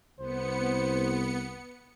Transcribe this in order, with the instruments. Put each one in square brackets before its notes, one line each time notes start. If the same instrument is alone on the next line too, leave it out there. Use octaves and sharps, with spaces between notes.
[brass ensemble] C2 [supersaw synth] B3 C#7 [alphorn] C5